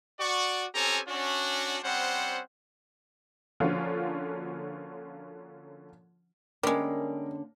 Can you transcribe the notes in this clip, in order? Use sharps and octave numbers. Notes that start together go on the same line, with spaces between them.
F#4 D5 C#6
C4 C#4 G4 A4 G#5 A#5
C#4 D4 F#4
G3 C4 C#4 C5 F#5
D3 F3 A#3 C#4 F4 F#4
D3 G3 G#3 A#3 C#4 A#4